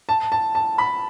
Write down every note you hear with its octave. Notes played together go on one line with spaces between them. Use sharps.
A5
A5
A5
B5